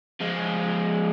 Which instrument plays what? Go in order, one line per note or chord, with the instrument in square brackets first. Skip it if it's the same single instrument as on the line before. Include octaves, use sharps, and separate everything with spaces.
[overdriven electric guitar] F3 G#3